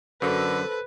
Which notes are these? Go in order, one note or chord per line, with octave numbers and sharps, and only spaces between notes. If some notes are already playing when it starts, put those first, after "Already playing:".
F#2 D3 A4 B4 C5